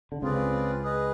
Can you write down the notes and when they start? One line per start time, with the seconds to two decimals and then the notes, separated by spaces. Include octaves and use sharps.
0.12 D3
0.22 C#2 C#3 C4 F4 G#4 B4 D5
0.83 G#4 B4 D#5